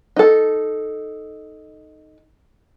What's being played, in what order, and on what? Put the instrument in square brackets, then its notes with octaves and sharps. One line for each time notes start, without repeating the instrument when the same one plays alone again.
[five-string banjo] D#4 A4